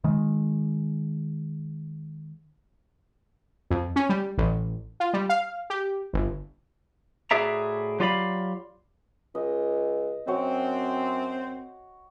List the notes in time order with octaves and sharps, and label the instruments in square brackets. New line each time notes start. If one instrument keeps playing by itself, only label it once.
[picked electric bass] D#3 G#3
[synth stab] F2
C#4
G3
A1
F4
G3
F5
G4
G1
[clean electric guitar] A2 F#4 G#4 D5 E5 A#5
F#3 F4 G4 D5 F5 B5
[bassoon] C#2 [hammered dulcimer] D#5
[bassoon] F#2 [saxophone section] C4 [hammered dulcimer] F#4 C#5